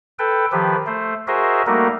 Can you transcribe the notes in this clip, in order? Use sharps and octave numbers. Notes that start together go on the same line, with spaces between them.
A4 B4 G5
D#3 F3 G4 B4
A3 C5
F#4 G#4 A#4 C5 D#5 E5
G3 A3 A#3 D#4 F#4 A#4